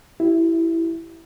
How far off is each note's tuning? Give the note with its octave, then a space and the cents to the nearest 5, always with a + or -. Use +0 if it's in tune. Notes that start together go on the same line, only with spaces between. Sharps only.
E4 +0 G4 -30